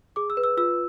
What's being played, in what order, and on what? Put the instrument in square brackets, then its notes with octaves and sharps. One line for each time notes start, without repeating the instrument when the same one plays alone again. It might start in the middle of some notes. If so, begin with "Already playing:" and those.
[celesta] G#4 D6
E6
B4
E6
F4 E6